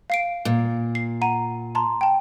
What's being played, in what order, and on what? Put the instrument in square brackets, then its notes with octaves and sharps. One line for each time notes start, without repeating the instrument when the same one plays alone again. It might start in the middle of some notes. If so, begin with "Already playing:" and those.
[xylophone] F5 C7 D7
[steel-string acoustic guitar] A#2
[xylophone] C7
F#5 A#5 D#7
A5 A#5 C6
G5 A5